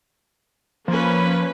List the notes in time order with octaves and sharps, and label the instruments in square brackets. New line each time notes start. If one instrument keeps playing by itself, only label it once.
[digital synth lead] F3 [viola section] A#3 C#4 B4